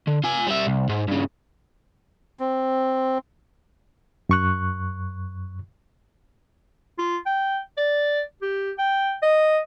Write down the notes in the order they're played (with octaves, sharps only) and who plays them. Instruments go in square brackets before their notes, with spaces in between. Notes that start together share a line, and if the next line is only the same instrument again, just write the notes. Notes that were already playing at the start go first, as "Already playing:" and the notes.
[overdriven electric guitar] D3
F4 G#5
G3 E5
C2
G#2
G2 C#3
[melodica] C4
[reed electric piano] F#2 C#6 F#6
[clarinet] F4
G5
D5
G4
G5
D#5